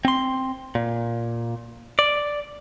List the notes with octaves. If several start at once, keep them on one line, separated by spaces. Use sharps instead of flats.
C4 C6
A#2
D5